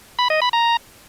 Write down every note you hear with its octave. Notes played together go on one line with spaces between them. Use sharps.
B5
D#5
B5
A#5